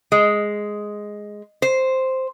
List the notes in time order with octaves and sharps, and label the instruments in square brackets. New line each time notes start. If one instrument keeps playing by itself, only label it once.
[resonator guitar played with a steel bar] G#3
C5